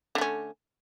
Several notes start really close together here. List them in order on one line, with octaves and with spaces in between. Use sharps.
D3 A3 C#4